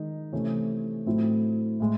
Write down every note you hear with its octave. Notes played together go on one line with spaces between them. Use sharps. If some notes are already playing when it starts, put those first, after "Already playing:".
Already playing: D#3 G#3 D#4
C3 E3 A3 C#4
A2 F#3 A3 C4 E4
A2 G#3